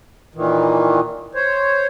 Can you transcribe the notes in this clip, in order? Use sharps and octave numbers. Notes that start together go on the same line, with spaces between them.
A#2 D#3 E3
C5 C#5